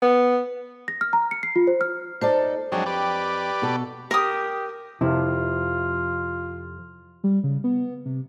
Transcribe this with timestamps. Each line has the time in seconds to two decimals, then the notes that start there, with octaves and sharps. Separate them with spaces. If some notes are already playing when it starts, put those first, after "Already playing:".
0.02 B3
0.88 A#6
1.01 F6
1.13 A#5
1.31 C#7
1.43 C7
1.56 F4
1.67 C5
1.81 F6
2.21 D#4 A4 C5 D5
2.72 F2 F#3 G#3 D4 G5
2.86 G4 B4 D5
3.62 B2 A4
4.11 G4 A#4 D#6
5.01 F2 C3 E4 F4
7.24 G3
7.43 C#3
7.64 B3
8.05 C3